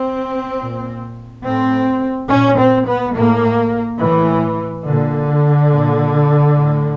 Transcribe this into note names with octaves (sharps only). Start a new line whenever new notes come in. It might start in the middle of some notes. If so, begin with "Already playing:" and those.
Already playing: C4
A#2
A2 C4
A#2 C#4
C4
B3
A2 A#3
A2 E3
A#2 D3
A#2
A2